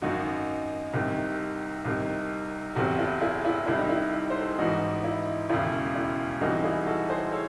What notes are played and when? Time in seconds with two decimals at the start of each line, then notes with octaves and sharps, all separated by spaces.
0.02 G#1 F#2 D#3 D#4 F#4
0.93 C2 C3 D#3
1.85 C2 C3 D#3
2.75 F#1 E2 C3 F#4 A4
2.99 E4
3.22 E4 G#4
3.44 E4 G#4
3.66 C2 C3 D#3 E4
3.78 D#4
3.89 E4
4.30 C5
4.39 A4
4.49 G#4
4.58 A1 G#2 E3 D#4 F#4
5.04 E4
5.50 E1 D#2 C#3 E4
5.95 E4
6.41 C2 C3 E3 D#4 F#4
6.64 E4 G#4
6.86 F#4 A4
7.10 G#4 C5
7.32 A4 C#5